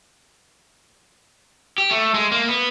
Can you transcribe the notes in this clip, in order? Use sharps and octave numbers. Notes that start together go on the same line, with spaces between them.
G4
A3
G#3
A#3
B3